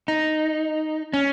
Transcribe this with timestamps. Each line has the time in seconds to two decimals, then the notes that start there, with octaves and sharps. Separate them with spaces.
0.08 D#4
1.13 C#4